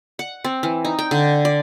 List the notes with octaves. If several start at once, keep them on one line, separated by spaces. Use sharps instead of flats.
F#5
C4
E3
D#4
G5
D3
D5